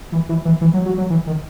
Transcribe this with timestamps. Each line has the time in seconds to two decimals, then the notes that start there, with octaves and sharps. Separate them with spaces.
0.12 E3
0.29 E3
0.45 E3
0.61 E3
0.74 F#3
0.86 F#3
0.98 F#3
1.10 E3
1.27 D#3